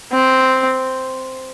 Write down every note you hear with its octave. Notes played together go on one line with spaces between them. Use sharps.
C4